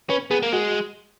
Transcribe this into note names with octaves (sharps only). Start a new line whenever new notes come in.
C#4 B4
B3 G#4
A#3
G#3 F#4